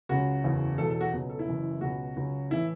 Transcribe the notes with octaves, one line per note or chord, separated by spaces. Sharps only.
C#2 C#3 F#3 F#4
F#1 E2 C#3
E1 E2 B2 F#3 A4
A4
F#4
C#2 B2 F#3
A4
E4
F#1 F#2 E3
C#2 B2 F#3 F#4
C#2 C#3 F#3
A2 E3 E4